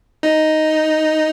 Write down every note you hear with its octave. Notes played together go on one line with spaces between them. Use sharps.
D#4